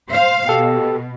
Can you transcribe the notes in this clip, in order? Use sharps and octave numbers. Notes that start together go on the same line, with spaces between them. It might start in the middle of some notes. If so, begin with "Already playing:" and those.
C5 F5
B2 G4 A4 G5